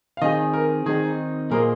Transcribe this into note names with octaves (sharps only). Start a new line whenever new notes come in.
F5
D#3 C4 G#4 D#5
A#4
D#3 C4 D#4 G#4
A#2 A#3 G#4 A#4 C5 D#5